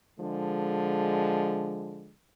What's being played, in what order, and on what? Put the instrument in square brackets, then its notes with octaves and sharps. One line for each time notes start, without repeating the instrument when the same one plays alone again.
[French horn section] D3 F3 G#3